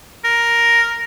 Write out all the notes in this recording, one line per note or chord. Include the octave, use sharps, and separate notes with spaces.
A#4